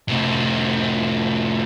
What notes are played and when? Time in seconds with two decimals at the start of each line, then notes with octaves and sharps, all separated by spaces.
0.08 A2 C3